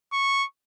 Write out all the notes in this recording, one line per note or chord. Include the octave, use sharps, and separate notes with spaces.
C#6